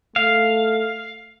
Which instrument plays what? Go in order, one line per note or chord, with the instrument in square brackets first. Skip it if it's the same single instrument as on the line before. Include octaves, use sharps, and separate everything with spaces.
[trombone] A3 [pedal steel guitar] F5